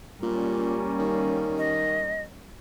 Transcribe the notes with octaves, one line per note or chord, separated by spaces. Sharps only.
A#2 G3 A#3 C#4
D#3
D#5